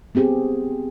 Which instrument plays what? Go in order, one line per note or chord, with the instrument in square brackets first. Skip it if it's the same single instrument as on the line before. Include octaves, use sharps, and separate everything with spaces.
[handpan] B3 C4 G4 G#4